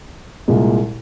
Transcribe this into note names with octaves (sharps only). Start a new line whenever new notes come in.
C2 A#2 G#3